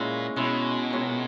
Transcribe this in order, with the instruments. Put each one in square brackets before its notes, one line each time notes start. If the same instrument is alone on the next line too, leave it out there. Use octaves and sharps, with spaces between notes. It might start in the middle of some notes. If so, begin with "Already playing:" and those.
Already playing: [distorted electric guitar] A#2 [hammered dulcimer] G#3 C#4 E4
[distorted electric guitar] B2 [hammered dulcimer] G#3 C#4 E4
[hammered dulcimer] A#2 G#3 C#4